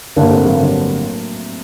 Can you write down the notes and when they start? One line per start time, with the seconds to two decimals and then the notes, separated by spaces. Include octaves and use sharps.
0.16 G1 G2 D3 A#3 D4
0.30 A3 C4
0.45 F#3 A3
0.60 G1 G2 D3